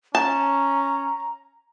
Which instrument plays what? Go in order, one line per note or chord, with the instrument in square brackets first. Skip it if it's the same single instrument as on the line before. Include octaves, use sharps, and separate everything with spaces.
[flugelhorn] C#4 [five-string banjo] A5 [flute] A#5